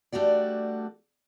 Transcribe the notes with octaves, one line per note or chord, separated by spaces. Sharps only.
G3 A3 D4 F#4 D5